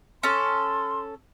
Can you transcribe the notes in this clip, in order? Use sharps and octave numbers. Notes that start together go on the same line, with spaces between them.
C#4 A4 C6